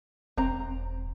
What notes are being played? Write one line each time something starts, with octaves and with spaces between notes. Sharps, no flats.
E1 C4 A#5